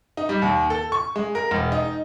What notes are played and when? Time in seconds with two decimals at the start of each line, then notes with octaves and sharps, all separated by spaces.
0.17 D#4
0.29 G3
0.42 D#2
0.70 A4
0.92 C#6
1.16 G#3
1.35 A#4
1.51 E1
1.72 D#4